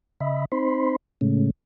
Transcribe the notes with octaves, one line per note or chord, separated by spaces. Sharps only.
C#3 D#5 E5 B5
C4 D#4 C5 B5 C6
A2 C#3 G#3 A3 C#4